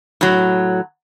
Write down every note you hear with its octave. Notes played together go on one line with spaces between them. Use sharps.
A2 F#3